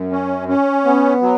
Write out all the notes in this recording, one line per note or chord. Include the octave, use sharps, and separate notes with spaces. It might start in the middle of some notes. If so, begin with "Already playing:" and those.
Already playing: F#2
C#4
C#4
B3
F#3